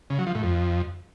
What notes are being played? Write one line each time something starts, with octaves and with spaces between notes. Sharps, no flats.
C#3
F#3
F3
A2
F2